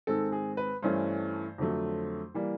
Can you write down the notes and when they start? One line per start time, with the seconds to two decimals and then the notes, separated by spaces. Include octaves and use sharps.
0.07 G#2 D#3 G#3 C4 A4
0.32 G#4
0.57 B4
0.82 G2 E3 A3 C#4 C5
1.58 F2 D3 F#3 A3
2.34 E3 G3 A#3